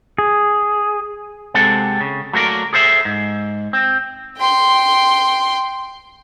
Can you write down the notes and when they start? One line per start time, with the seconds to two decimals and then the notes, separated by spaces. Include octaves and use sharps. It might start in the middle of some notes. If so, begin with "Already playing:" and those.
0.18 G#4
1.54 C3 G#3 C4 A4 F#5
2.01 C#3
2.33 F#3 A3 A#3 A#4 D5
2.73 G#4 A4 C5 E5
3.05 G#2
3.73 C4
4.38 G5 C6